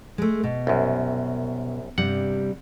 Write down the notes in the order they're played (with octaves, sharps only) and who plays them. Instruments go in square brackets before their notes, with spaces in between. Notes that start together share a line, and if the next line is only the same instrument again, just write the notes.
[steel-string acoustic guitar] G#3 A3
B2
[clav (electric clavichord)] C2 F#2
[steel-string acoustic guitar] G2 C3 G3 [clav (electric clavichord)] F#5